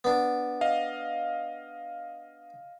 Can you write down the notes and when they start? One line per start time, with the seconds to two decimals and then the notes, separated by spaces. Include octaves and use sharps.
0.04 B3 D4
0.61 D#5 F5